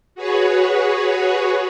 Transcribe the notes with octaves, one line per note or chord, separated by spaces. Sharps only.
F#4 G#4 B4 C#5